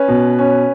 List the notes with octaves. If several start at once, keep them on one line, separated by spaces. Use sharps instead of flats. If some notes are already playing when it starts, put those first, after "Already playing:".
Already playing: C#4 B4
B2
C#4